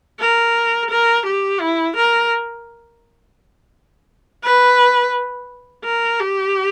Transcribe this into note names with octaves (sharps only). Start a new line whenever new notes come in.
A#4
A#4
G4
E4
A#4
B4
A#4
G4